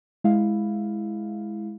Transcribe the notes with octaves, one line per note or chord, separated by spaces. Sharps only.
G#3 E4 F5